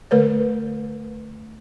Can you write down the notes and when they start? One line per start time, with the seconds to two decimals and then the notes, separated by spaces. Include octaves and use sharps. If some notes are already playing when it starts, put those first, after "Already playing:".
0.11 D3 A3 A#4 B4 C#5